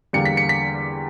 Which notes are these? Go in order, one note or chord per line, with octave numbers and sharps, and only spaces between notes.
E2 D3 G3 A#3 C#7
B6
C#7
B6